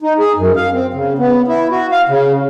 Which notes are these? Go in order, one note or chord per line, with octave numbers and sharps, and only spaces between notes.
D#4
G#4
F#2
F5
C4
C#3
B3
E4
F#4
F5
C#3